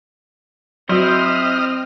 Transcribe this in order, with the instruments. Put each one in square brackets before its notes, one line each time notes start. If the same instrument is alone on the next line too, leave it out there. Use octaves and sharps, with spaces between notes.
[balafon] F#3 F#4 [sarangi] C4 [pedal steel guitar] E4 C5 [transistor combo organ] D#5 F6